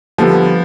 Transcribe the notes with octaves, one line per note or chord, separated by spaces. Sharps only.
D3 F3 G3 B3